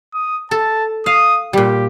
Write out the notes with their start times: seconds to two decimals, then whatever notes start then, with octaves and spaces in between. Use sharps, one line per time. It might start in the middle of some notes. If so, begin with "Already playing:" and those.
0.14 D#6
0.51 A4 A5
1.06 F5 D#6
1.53 A#2 G3 G4